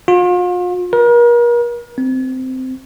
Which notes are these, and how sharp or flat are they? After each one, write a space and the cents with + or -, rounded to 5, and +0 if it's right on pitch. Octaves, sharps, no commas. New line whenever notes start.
F4 +40
A#4 +40
C4 -15